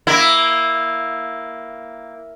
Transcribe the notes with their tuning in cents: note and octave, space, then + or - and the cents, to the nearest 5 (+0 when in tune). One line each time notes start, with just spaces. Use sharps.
A#3 +0 E4 +0